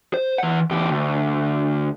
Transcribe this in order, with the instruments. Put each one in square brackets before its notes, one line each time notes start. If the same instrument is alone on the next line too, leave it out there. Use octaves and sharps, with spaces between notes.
[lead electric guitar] C5
E3 F#5
E2 G4
D2